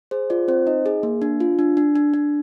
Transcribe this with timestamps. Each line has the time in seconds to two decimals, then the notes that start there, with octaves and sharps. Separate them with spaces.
0.11 G#4 C5
0.30 F4 D5
0.48 C4 C5
0.66 D#4 D#5
0.86 G#4
1.03 A#3
1.22 D4
1.40 F4
1.59 D4
1.77 D4
1.95 D4
2.14 D4